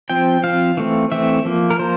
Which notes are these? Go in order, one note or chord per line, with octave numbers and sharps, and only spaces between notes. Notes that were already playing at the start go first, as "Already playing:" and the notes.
F3 C4 G5
F3 C4 F5
E3 A3 C4
E3 A3 C4 E5
F3 A#3
A#4
F3 A#3 C5